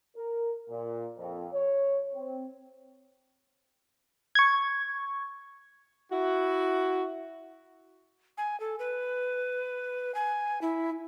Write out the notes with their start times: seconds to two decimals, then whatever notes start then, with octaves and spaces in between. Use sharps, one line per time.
0.16 A#4
0.69 A#2
1.18 F2
1.53 C#5
2.14 C4
4.35 C#6 G#6
6.11 E4 F#4
8.38 G#5
8.60 A4
8.79 B4
10.15 G#5
10.62 E4